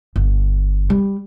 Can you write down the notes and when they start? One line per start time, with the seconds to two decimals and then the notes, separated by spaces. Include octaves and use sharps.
0.16 G1
0.90 G3